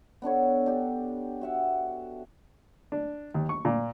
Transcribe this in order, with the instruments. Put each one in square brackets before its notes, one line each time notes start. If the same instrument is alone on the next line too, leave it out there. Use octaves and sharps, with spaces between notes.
[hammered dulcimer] B3 D4 A4 C#5
D4 G4
F#4 E5 F#5
[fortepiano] D4
D#2
C#6
A#2